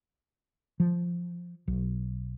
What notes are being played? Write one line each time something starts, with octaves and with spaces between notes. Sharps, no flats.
F3
B1